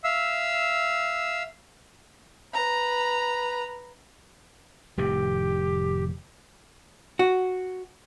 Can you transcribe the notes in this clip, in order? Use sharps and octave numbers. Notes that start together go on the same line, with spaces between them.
E5 F5 E6
B4 A#5
F1 A2 D#3 G4
F#4